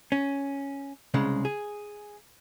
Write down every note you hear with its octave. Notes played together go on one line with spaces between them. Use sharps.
C#4
C2 C#3 G#3
G#4